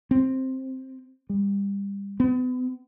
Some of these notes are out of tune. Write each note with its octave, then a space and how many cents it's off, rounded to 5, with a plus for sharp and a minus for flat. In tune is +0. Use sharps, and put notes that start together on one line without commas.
C4 +5
G3 +25
B3 +35